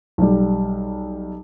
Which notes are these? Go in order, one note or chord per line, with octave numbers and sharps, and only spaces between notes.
B1 G3